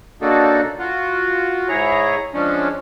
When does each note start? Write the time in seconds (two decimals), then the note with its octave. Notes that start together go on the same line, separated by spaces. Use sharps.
0.22 C#3 A#3 D4 D#4 F#4 A4
0.79 F4 F#4
1.69 G#2 E4 G#4 C#5 A#5
2.34 F3 G#3 C#4 D4